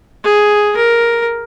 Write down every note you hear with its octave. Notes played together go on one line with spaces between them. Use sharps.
G#4
A#4